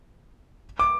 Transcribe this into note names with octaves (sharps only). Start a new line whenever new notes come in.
D6